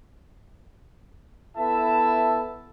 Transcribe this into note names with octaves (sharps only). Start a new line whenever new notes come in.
B3 E4 A4 E5 A5